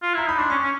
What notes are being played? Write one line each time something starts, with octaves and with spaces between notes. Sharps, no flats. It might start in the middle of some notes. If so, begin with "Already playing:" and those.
F4
E4 A#5
D#4 B5
D4 C6
C#4 C#6
C#4